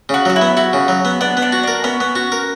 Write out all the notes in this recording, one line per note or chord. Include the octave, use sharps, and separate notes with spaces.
C#3 F#4
F#3 F#4
E4
B3
E4 F#4
C#3
F#3
B3
B3 D4
B3
D4
F#4
D4 A#4
B3 C#4
B3
F#4
A#4